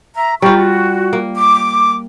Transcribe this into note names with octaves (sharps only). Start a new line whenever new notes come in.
E5 A#5
G3 F4 G5 A#5 C#6
F#4
A#3
D6